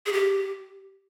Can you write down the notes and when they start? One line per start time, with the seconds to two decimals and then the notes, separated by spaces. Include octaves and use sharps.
0.06 G#4
0.13 G4